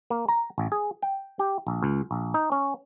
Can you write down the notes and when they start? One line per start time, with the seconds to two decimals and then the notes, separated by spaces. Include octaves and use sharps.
0.10 A#3
0.28 A#5
0.58 A1
0.72 G#4
1.02 G5
1.39 G4
1.67 A#1
1.83 C#2
2.11 A#1
2.34 D#4
2.52 C#4